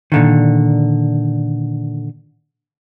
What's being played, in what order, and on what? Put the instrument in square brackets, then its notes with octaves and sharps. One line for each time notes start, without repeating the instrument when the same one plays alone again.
[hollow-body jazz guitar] A#2 D3 D#3